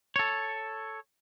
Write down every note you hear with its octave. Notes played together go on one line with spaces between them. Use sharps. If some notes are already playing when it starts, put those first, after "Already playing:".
A4 C#5